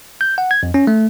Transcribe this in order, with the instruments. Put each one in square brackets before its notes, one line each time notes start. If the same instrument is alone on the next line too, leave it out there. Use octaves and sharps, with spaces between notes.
[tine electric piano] G6
F#5
G#6
F2
C#4
A3